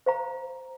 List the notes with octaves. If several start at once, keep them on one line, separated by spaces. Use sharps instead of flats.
C5 F5 A#5